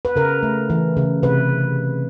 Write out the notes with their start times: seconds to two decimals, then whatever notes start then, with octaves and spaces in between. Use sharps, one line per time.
0.05 B4
0.16 C#3 A#4
0.43 A3
0.70 E3
0.97 C#3
1.23 C3 B4